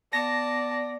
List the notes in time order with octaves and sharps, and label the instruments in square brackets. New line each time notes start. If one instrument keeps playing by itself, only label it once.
[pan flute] B3 [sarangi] D5 [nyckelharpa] A5 [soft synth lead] A#6